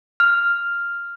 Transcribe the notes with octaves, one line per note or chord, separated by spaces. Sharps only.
F6